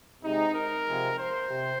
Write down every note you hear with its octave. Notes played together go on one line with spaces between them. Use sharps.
C3 G#3 D#4
A#4
C3 F3 G#3
C5
C3